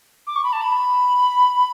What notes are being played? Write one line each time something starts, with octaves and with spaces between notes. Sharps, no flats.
D6
C#6
B5
A5
B5